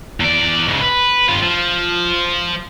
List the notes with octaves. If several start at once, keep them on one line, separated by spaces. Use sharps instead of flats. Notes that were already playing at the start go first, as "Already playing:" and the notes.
E2 D5
G#2 C#3
B4
G2 F4
F3